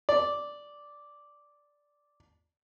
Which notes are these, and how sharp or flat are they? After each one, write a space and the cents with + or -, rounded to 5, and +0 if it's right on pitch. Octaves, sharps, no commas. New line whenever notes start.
D5 -5